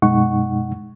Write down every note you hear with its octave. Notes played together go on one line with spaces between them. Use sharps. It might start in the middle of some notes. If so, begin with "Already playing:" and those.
F#2 B2 G#3 D#4 F#5 C#6